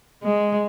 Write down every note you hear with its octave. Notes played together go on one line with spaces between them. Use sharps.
G#3